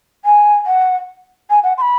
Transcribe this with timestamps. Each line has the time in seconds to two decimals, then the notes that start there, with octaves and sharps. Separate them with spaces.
0.25 G#5
0.66 F#5
1.50 G#5
1.64 F#5
1.78 C6
1.82 B5